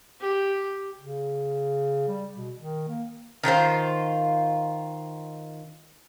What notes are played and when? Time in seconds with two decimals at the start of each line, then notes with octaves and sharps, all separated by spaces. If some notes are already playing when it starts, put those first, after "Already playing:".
0.20 G4
0.99 C#3
2.08 G3
2.35 B2
2.57 D#3
2.88 A#3
3.43 D#3 F4 A#4 C5